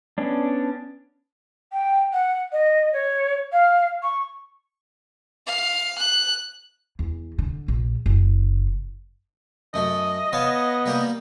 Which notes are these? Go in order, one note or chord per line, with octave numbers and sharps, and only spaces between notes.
B3 C#4 D4
G5
F#5
D#5
C#5
F5
C#6
F5
F#6
E2
D3
A#1
F#1
F#2 A3 D#5
B3 C#5 F5 A5
G3 A#3 G4